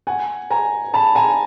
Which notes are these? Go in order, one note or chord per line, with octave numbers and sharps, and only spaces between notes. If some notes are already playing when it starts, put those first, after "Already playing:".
F#5 G#5
G#5 A#5
A5 B5
G#5 A#5